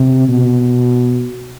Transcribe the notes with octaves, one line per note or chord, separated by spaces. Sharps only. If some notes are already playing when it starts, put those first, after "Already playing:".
Already playing: C3
B2